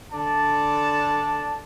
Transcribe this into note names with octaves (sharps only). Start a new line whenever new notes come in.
D3 D5 A5